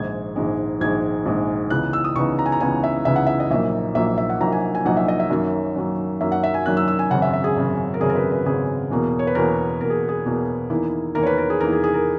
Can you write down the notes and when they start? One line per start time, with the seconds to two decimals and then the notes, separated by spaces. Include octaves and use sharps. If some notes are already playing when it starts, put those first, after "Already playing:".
Already playing: A#1 G#2 D#3 G#3 G#6
0.36 A#1 G#2 D#3 G#3
0.81 A#1 G#2 D#3 G#3 G#6
1.26 A#1 G#2 D#3 G#3
1.70 C#2 C#3 E3 B3 D#4 F#6
1.93 E6
2.04 D#6
2.16 C#2 C#3 E3 B3 D#4 C#6
2.39 A#5
2.46 G#5
2.52 A#5
2.60 C#2 C#3 E3 B3 D#4 G#5
2.84 E5
3.05 C#2 C#3 E3 B3 D#4 E5
3.16 F#5
3.27 E5
3.40 D#5
3.50 A#1 A#2 F#3 A#3 D#4 E5
3.95 A#1 A#2 F#3 A#3 D#4 E5
4.18 E5
4.30 F#5
4.41 A#1 A#2 F#3 A#3 D#4 A#5
4.52 G#5
4.75 G#5
4.85 A#1 A#2 F#3 A#3 D#4 F#5
4.97 E5
5.08 D#5
5.20 E5
5.30 F#2 D#3 F#3 A#3
5.75 F#2 D#3 F#3 A#3
6.20 F#2 D#3 F#3 A#3 E5
6.32 F#5
6.44 E5
6.54 G#5
6.66 F#2 D#3 F#3 A#3 F#6
6.77 E6
6.88 E6
6.99 G#5
7.10 G#1 F#2 C#3 F#5
7.22 E5
7.33 E5
7.44 G#4
7.56 G#1 F#2 C#3
7.94 A#4
8.00 G#1 F#2 C#3 G#4
8.10 A#4
8.16 B4
8.31 B4
8.46 G#1 F#2 C#3 G#4
8.91 E2 B2 A#3
9.19 C#5
9.27 B4
9.35 E2 B2 A#3 A#4
9.81 E2 B2 A#3 A#4
9.90 G#4
10.09 G#4
10.26 E2 B2 A#3
10.70 E2 D#3 A#3 E4
11.15 E2 D#3 A#3 E4 A#4
11.23 C#5
11.27 B4
11.38 A#4
11.50 G#4
11.60 E2 D#3 A#3 E4 A#4
11.72 G#4
11.84 G#4
11.94 A#4